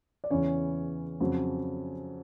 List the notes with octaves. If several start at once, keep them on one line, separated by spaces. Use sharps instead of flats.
D5
E2 C#3 E3 C#4 C#5
F2 C#3 F#3